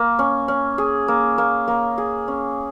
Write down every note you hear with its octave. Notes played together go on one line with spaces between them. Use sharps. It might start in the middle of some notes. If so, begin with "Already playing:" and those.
Already playing: A#3
C#4
C#4
G#4
A#3
A#3
A#3
G#4
C#4